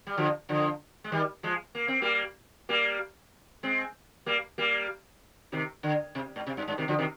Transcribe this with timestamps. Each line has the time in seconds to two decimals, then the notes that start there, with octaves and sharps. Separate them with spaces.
0.07 G3
0.17 D3 F3
0.49 D3 F3
1.04 G#3
1.12 D#3 G3
1.43 F3 G#3
1.75 A#3
1.88 C4
2.02 G3 A#3
2.69 G3 A#3
3.63 G#3 C4
4.26 G3 A#3
4.58 G3 A#3
5.52 C3 D#3
5.83 D3
6.15 C3
6.36 G#2
6.47 C3
6.57 G2
6.68 G2
6.78 C3 D#3
6.88 D3 F3
6.98 C3 D#3